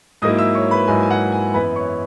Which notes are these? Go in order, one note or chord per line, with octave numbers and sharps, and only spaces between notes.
G#2 F#3 A#3 E4 D#5 D#6
E5 E6
C#5 C#6
B4 B5
G#2 F#3 A#3 E4 G#5
G#5
F#5
G#5
F#2 E3 B3 E4 B4 B5
C#5 C#6